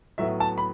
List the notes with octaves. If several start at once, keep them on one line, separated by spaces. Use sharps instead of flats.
A2 F#3 B3 E5
A5
B5